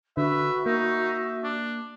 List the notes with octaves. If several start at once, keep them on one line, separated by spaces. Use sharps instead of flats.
D3 F#4 B4 E5
A#3 D#4 E5
D4